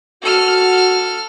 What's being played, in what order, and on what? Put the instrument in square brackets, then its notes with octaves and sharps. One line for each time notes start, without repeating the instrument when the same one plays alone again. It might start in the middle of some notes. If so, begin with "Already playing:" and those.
[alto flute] F#4 [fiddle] A4 F6